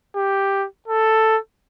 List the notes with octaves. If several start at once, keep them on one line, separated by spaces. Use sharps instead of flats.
G4
A4